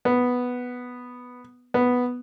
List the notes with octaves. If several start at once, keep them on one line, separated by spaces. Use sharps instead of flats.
B3
B3